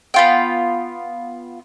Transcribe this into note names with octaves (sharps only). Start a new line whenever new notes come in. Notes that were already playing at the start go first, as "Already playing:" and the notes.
B3 F4 G5